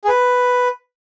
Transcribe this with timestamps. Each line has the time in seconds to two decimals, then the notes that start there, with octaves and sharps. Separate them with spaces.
0.04 G#4
0.08 B4